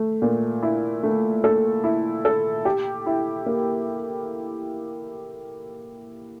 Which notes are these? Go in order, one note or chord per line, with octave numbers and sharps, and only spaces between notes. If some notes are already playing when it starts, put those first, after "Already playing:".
Already playing: A3
A#2
E4
A3
A4
E4
A4
G4
E4
A#3